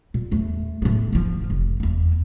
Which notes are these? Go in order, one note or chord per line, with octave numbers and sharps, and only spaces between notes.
A#2
E2 A3
A2 B3
G#2 F3
F1
E2 A#3